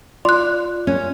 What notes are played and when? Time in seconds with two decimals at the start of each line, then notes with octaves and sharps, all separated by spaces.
0.25 F4 D5 C6 F#6
0.87 C#4